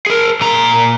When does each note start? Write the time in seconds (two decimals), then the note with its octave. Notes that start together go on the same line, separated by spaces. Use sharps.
0.07 G#4 A#4
0.41 A#2 A#5